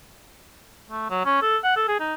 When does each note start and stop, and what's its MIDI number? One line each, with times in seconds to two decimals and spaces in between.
0.90 1.05 57
1.10 1.24 54
1.25 1.38 61
1.42 1.57 69
1.64 1.75 78
1.76 1.85 69
1.88 1.98 68
2.00 2.14 63